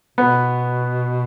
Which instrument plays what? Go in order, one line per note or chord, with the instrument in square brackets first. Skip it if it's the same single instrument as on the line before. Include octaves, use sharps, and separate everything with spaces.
[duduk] B2 [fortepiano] B3